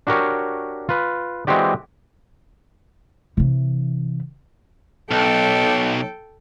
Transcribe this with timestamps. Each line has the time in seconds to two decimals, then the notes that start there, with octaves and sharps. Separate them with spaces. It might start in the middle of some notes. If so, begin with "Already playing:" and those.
0.07 D4 F#4 G4 A#4 C#5
0.89 F4 B4
1.47 E3 G#3 C4 F#4 G4 D5
3.37 C3 E3
5.11 B1 A4 G5